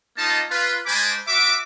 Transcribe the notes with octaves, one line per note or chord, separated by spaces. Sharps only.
A#3 D#4 F4 D#5 A5
F4 B4
G#3 C5 G#5 A5 B5 D6
F#4 E5 D6